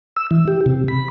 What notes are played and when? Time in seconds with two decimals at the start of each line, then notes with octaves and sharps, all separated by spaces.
0.16 E6
0.31 E3
0.48 G4
0.66 C3
0.88 B5